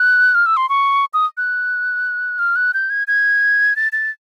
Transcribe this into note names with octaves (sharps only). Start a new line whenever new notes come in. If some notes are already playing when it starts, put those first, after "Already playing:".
Already playing: F#6
F6
E6
C6
C#6
D#6
F#6
F6
F#6
G6
G#6
G#6
A6
A6